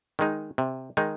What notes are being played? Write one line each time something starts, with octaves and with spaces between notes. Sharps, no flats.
D#3 G#3 D#4
C3
D#3 G#3 D#4